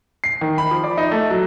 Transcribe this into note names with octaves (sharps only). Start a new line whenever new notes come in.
C7
D#3
B5
F3
D5
D#4
A3
F#3